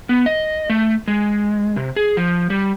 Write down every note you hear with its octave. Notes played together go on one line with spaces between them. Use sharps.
B3
D#5
A3
G#3
C3
G#4
F3
G3